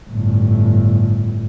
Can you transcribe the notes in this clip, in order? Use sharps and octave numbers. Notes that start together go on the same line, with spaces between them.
G1 A2